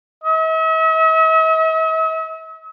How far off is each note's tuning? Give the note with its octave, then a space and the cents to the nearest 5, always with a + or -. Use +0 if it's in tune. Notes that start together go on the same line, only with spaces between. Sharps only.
E5 -45